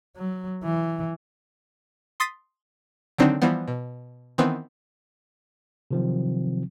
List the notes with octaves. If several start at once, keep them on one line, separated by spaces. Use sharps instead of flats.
F#3
E3
C6 D#6 A6 B6 C7 D#7
D3 D#3 F#3 C4 D4 D#4
E3 F3 G3 B3
B2
D#3 E3 B3 C4
C3 D#3 F3 F#3 C4